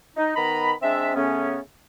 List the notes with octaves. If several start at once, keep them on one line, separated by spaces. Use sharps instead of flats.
D#4
D#3 B3 D#5 A#5 B5
G#3 C4 D4 E5
C#3 A3 B3 C#4